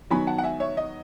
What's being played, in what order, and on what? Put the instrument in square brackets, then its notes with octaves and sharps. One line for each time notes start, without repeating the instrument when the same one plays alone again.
[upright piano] D#3 F#3 B3 G#5 B5
F#5 A5
F#5
E5 G#5
C#5 E5
D#5